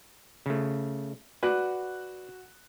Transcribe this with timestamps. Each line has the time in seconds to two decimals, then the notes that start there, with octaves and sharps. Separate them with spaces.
0.46 C#3 A3
1.43 F#4 B4 D5 F#6